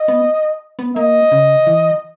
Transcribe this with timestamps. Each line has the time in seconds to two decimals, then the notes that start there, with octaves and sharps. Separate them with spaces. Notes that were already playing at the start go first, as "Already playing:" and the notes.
Already playing: D#5
0.08 B3
0.79 B3
0.96 A#3 D#5
1.32 C#3
1.67 E3